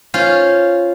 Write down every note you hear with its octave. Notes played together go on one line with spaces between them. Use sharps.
C#4 F4 C5